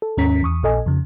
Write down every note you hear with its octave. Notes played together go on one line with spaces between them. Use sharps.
A4
D#2 G#2 C#4 A#5 B6
E2 C#6 D#6
A#1 A#2 A4 D#5 G#5
F2 C#3